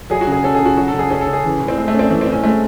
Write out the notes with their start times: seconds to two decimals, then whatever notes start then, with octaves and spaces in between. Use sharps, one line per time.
0.10 F#3 G#4
0.21 F#4
0.27 C#3
0.32 G#4
0.44 C#4 A4
0.55 G#4
0.60 C#3
0.65 F#4
0.77 F#3 F#4
0.88 A4
0.93 C#3
0.99 G#4
1.10 C#4 G#4
1.21 A4
1.27 C#3
1.33 G#4
1.44 E3
1.60 A2
1.68 C4
1.77 G#3 A3
1.88 A3
1.94 C4 C#4
2.10 E3 A3
2.21 C4
2.26 A2
2.32 C#4
2.43 G#3 A3